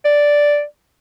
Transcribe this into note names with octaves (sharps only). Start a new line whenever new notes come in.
D5